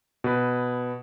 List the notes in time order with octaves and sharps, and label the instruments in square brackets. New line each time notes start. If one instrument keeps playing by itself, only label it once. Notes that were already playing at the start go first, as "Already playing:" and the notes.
[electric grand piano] B2 B4